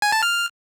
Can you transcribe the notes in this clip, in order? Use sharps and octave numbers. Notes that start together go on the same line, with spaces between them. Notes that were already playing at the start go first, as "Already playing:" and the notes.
G#5
A5
F6